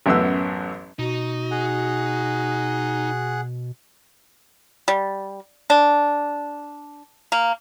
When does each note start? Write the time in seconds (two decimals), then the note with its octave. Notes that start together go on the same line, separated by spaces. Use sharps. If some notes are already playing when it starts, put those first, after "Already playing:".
0.06 A1 F#2 B3 E6
0.99 B2 D#4 F#4
1.51 G#4 F#5
4.88 G3
5.70 D4
7.32 A#3